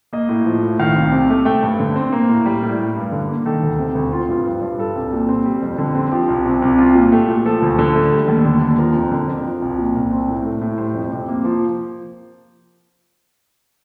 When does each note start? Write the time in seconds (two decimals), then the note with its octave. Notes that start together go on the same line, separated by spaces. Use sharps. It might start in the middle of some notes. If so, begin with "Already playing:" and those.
0.13 A#3 D#5
0.29 A2
0.46 F3
0.63 A2
0.79 D#3 F5
0.96 C2
1.12 C3
1.30 A3
1.45 A3 G5
1.63 G2
1.79 D3
1.96 C4
2.12 A#3 A#4
2.29 A2
2.46 G3
2.63 A2
2.79 G3
2.96 G2
3.12 D3
3.29 A#3
3.46 D#3 A4
3.63 D2
3.79 C3
3.95 D2
4.12 C4 F4
4.28 G2 F4
4.45 F3 G4
4.62 G2
4.78 G3 A4
4.96 C2
5.13 A#2
5.29 C4
5.45 G3
5.62 F2
5.78 D3
5.95 C4
6.12 F3 G4
6.28 C2
6.46 C3
6.62 C2
6.78 C4 F4
6.95 A#2
7.12 A3 G4
7.29 A#2
7.45 F3 A4
7.62 D2
7.79 D3
7.95 A3
8.12 G3
8.28 D#2
8.45 D3
8.61 D#2
8.78 F3 A#4
8.95 F2
9.11 D3
9.28 F2
9.45 F3
9.62 C2
9.78 A#2
9.95 C2
10.11 C4
10.28 A2
10.45 A3
10.61 A2
10.78 G3 C5
10.94 F2
11.12 C3
11.28 A#3
11.44 F3